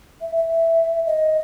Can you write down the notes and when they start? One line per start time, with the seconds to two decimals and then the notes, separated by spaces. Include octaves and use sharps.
0.21 E5
0.36 E5
1.06 D#5